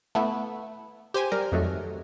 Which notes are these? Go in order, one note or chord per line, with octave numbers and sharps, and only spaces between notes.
A3 B3 E4
G4 C5 G#5
G3 A#4
F2 D#3 F#3 A3